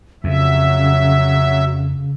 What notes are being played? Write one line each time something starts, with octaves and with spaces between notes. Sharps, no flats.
F2 C#3 F#3 E5